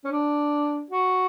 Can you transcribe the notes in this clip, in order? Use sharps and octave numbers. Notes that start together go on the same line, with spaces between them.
C#4
D4
F#4